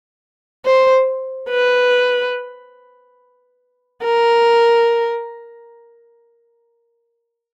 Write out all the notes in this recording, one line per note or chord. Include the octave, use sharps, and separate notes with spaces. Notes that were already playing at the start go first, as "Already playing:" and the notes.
C5
B4
A#4